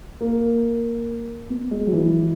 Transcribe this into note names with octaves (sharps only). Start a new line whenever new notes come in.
A#3
B3
G#3
F#3
E3